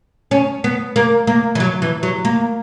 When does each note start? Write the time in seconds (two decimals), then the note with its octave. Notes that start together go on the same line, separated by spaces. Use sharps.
0.31 C#4
0.64 B3
0.96 A#3
1.27 A#3
1.55 E3
1.60 F#3
1.82 E3
2.03 F#3
2.25 A#3